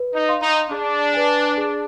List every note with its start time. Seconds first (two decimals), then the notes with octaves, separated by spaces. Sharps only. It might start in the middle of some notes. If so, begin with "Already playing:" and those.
Already playing: B4
0.13 D#4
0.29 F5 C6
0.42 D#4
0.71 D4 G#4
1.14 B4 D5 G#5
1.57 G#4